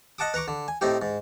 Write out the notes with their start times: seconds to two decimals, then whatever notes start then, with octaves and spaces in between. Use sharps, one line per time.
0.18 D#5 F#5 A5 D6 D#6
0.34 B4 A#5 C#6 D6
0.48 D3
0.68 G#5
0.81 A2 C4 D#4 G4
1.02 G#2